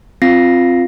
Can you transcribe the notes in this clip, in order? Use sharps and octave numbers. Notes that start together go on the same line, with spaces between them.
C4 F4 F5 A#6 C7